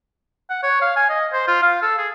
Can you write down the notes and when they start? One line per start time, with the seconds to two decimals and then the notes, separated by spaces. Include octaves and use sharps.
0.50 F#5
0.63 C#5
0.82 F5
0.97 G#5
1.10 D#5
1.33 C5
1.48 F4
1.63 F5
1.82 A4
1.98 G#4